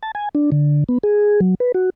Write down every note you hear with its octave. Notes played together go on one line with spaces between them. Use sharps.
A5
G#5
D4
D3
B3
G#4
F#3
B4
F#4